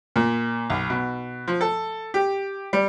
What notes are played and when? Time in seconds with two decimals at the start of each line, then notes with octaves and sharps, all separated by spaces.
0.16 A#2
0.70 B1
0.90 B2
1.48 F3
1.61 A4
2.14 G4
2.73 G3